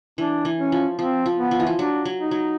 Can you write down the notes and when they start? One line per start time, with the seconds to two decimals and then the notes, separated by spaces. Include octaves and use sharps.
0.18 E3 D4
0.45 E3
0.59 C#4
0.72 F3
0.98 F3 C4
1.26 F3
1.39 B3
1.51 F3
1.60 E3
1.67 F3
1.78 F#3 D4
2.05 F#3
2.19 D#4
2.31 F#3